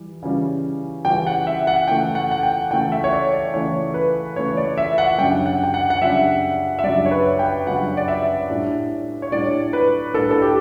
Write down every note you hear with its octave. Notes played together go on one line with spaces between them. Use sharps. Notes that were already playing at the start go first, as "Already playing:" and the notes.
Already playing: E3 G3
C#3 E3 G3 C#4
C#3 E3 G3 C#4 G5
F#5
E5
F#5
C#3 E3 A3 G5
F#5
F#5
G5
C#3 E3 A3 G5
E5
C#5
D5
D5
C#3 E3 A3 C#5
B4
C#3 E3 A3 C#5
D5
E5
F#5
F#2 C#3 G3 D4 G5
F#5
G5
F#5
F#5
F#2 C#3 G3 D4 E5
E5
F#2 C#3 G3 D4 D5
C#5
B4
G5
F#2 C#3 G3 D4 F#5
D5
E5
A2 G3 D4
C#5
A2 G3 D4 D5
B4
A2 G3 D4 A4
A4
G4